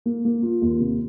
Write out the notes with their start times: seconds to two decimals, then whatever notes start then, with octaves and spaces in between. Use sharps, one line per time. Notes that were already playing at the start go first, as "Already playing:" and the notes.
0.06 A#3
0.25 A#3
0.42 F4
0.62 D#2
0.80 C3